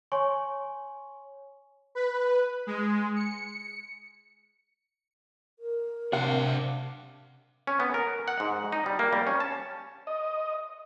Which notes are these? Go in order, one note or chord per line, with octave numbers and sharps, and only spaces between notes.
C#5 G#5 C6 C#6
B4
G#3
C#7
A#4
C3 D4 F5 F#5
C#4
B3
A#4
F#5
G#2
D#4
G3
A#3
G3
C#4
A5
D#5